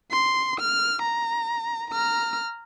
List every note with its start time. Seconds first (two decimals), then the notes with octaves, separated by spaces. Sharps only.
0.11 C6
0.60 F6
1.02 A#5
1.91 A#5 F6